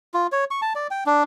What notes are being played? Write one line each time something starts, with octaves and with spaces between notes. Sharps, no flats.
F4
C#5
C#6
A5
D5
G5
D4